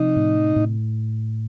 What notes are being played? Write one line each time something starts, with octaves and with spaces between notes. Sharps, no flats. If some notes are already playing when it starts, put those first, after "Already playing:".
Already playing: C3 F3 D#4
A2
A2